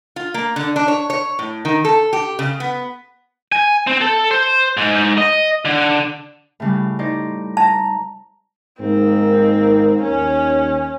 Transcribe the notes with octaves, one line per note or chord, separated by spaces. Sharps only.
F4
A#3
D3
D4
C#5
C#5
A2
D#3
A4
G4
C#3
B3
G#5
C4
A4
C5
G#2
D#5
D3
A2 C#3 G3
D#4 C5 D5
A5 A#5
G#2 D#3 A#3 C4 A#4
D#2 C#4